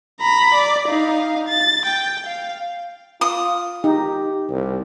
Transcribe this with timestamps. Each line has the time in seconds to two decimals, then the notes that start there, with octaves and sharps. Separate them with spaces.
0.20 A#5 B5
0.54 D5
0.88 D#4 F5
1.48 A6
1.86 G5
2.27 F5
3.21 F4 D#6
3.84 D#4 G4
4.50 C2 G4